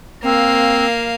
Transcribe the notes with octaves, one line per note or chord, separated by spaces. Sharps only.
A#3 C4 F5